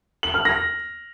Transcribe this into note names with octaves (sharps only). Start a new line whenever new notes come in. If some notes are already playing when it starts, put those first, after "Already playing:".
F#7
F6
A#6